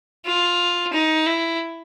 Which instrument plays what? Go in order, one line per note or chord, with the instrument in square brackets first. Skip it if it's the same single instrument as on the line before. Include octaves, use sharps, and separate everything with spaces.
[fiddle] F4
D#4
E4